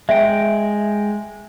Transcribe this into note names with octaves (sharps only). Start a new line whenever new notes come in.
G#3 E5 G5